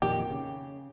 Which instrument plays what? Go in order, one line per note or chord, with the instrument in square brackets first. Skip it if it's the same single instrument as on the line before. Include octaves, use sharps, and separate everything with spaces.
[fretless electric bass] F2 A#2 D#3 [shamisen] G4
[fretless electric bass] C#3